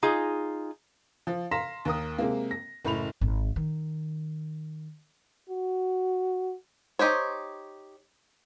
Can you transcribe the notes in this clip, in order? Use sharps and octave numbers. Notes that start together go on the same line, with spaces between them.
D#4 F4 G#4
F3
F5 A#5 C6 A#6 B6 E7
D#2 A#4 D#6
C3 G#3 A#3
A#6
F#1 A2 B5 F7
G#1
D#3
F#4
D#4 G4 C5 C#5